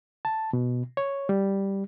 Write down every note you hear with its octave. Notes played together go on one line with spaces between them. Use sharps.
A5
B2
C#5
G3